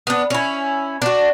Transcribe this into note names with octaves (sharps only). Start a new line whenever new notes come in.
B3 D4
C#4 E4
D4 F#4